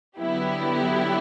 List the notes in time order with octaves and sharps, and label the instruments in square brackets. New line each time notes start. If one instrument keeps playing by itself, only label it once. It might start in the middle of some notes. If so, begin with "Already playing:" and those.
[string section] D3 F#3 B3 E4 G4